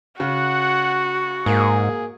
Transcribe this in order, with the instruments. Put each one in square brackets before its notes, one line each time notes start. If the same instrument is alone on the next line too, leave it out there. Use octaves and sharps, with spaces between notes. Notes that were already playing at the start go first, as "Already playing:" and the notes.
[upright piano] C#3 [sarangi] F#4 [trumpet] F#5
[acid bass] G#2 [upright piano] A#3 [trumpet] G#4